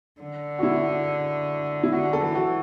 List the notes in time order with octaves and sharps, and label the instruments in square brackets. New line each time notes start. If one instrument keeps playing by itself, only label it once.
[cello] D3
[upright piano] F#4
E4
E4
[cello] D3 [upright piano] F#4
[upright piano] A4
[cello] E3
[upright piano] F#4